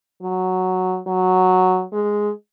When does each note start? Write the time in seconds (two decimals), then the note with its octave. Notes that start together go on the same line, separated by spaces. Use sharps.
0.22 F#3
1.07 F#3
1.93 G#3